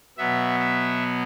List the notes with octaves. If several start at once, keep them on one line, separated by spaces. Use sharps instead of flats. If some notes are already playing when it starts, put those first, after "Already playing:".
B2 F#3 B3 E5
E5